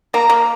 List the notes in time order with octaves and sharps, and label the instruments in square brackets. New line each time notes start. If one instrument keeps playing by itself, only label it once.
[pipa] A#3 [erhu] A#5
[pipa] A#3